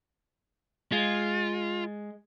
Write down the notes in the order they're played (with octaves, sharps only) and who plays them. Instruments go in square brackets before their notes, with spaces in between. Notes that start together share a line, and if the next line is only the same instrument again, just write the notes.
[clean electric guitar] G#3 [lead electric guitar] F4